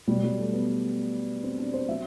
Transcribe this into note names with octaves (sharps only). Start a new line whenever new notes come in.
B2 F#3 G3
G3
A3
B3
C4
D4
C5
F#3 E5